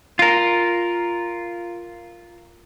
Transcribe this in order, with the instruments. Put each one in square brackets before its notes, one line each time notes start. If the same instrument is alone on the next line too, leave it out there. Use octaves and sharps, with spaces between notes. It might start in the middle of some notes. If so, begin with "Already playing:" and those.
[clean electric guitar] F4 A#4